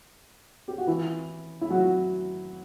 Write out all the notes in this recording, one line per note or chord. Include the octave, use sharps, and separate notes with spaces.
G4
F#4
E3 E4
E4
F#3 F#4